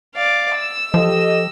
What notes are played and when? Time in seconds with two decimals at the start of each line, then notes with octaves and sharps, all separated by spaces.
0.15 D5 F5
0.56 E6
0.94 F3 G4 A4 D#5